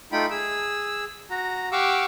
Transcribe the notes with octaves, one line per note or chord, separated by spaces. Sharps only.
A3 D#4 F4 G5 B5
G#4 E6
F#4 A#5
G4 F5 F#5 C#6 D6 E6